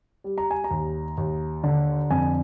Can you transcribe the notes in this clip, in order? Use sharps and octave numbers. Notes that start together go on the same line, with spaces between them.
G3
A#5
G#5
A#5
D#2
D#2
D3
F2 G#5